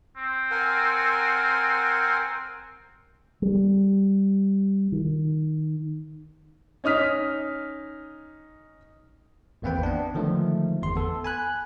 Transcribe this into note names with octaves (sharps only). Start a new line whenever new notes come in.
C4
A#4 F#5 G#5
G3
D#3
C#4 D#4 D#6 F6 B6
G#1 E2 A#3 C4 B4 G5
B3 D4
D3 D#3 F3 G#3 A3
G1 E2 C6
B3 A4
G#5 B5 F#6